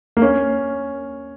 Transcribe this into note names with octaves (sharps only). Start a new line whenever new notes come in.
A#3
C#4